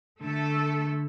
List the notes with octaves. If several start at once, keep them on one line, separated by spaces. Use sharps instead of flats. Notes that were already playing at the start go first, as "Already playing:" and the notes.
D3 A3 A4